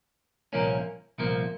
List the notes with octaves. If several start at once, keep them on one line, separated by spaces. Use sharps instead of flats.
C2 A#2 F3 A#3 C#4
C2 A#2 F3 A#3